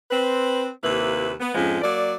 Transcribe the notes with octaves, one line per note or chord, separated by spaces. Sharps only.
C4 B4
D#2 C3 A#3 E4 B4
B3
F2 G#2 F3 G#3 C#4
F#3 A#3 D5